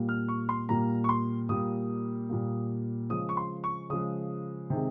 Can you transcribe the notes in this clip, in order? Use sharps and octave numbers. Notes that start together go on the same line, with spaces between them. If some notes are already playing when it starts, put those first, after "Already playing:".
Already playing: A#2 G3 A#3
F6
C#6
C6
A#2 G3 A#3 A#5
C#6
C6
A#2 G3 A#3 D#6
A#2 G3 A#3
C#3 F3 G#3 D#6
C#6
C6
C#6
C#3 F3 G#3 D#6
C3 D#3 G#3